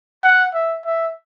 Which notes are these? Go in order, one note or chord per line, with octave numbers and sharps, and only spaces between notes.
F#5
E5
E5